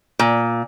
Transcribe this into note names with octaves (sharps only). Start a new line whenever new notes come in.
A#2